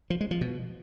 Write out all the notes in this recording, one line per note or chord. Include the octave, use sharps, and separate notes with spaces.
F3
G#3
F3
B2